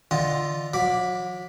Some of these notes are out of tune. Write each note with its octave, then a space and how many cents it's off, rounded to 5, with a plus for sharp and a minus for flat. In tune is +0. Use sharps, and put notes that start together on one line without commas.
D3 +0 F4 +0 D#5 +10
F#3 -35 B5 +0 D6 +0